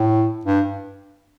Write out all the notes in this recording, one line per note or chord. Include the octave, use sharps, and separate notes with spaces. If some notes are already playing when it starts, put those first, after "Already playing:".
Already playing: A2
G2